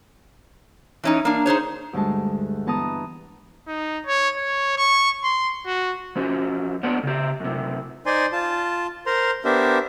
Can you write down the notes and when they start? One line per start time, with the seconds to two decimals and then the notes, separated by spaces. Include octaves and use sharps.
1.04 E3 C#4 D#4
1.25 A#3 D4
1.46 D#4 G#4 C5 C#5
1.93 D2 G2 G#3 A5
2.66 E3 B3 A5 A#5 D#6
3.68 D#4
4.06 C#5
4.36 C#5
4.77 C#6
5.23 C6
5.66 F#4
6.16 F3 C#4 F#4
6.83 B3 D4 C#5 F#5
7.03 C#3 G4
7.40 F#2 C3
8.06 D#4 C5 D5 G#5 C6
8.32 F4 A5
9.06 A#4 C5 A#5 C6
9.45 B3 D4 G4 A#4 C5 E5